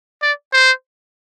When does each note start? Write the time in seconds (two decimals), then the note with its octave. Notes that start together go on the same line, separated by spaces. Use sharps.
0.22 D5
0.53 C5